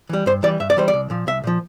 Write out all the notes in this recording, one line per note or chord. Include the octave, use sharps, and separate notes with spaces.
E3 G3
G2 C5
E3 G3 D5
G2 E5
D5
E3 G3 C5
D5
C2
A#2 F3
C2 E5
A#2 F3